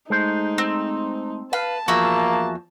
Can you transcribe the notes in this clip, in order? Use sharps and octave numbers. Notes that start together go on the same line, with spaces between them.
G#3 A3 D#4 C5
C4
B4 F5 A5
E2 F3 A#3 F#4 G#4 E5